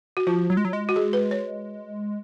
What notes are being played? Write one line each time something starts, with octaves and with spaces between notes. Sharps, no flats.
F#4
F3 F4
F#3
G#3
F#3
G#3
F#4
G#4
B4
C#5